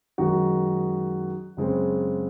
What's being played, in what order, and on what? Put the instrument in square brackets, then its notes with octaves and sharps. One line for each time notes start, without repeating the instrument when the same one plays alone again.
[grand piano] F#2 D#3 G#3 D#4 F#4
F#2 C#3 G#3 C4